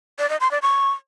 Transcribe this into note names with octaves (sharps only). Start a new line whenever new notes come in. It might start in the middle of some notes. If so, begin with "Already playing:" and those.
D5
D#5
C6
D5
C#6